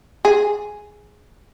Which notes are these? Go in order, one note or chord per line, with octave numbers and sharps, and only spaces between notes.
G#4